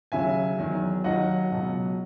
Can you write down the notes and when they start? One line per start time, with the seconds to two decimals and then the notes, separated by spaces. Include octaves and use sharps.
0.12 D#2 C#3 F#3 E5 G#5
0.58 E2 D#3 F#3
1.04 D#2 D#3 F#3 D#5 F#5
1.51 C#2 B2 F#3